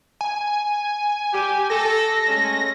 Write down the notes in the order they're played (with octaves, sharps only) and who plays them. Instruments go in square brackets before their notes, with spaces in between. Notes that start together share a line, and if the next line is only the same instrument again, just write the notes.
[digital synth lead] G#5
[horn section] G4
[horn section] A4 [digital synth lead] A#6
[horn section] G#3 A3 C#4